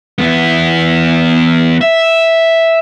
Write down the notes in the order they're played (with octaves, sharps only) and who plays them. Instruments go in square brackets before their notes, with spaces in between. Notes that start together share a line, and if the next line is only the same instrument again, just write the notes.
[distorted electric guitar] E2 B3
E5